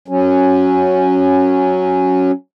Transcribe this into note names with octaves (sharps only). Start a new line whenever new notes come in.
F#3 C#4